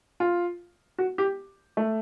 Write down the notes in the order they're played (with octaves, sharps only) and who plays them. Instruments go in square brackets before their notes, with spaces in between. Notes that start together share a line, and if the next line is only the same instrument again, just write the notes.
[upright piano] F4
F#4
G4
A3